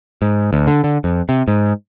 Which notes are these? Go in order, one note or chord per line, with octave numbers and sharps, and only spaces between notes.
G#2
D2
D3
D3
F2
C3
G#2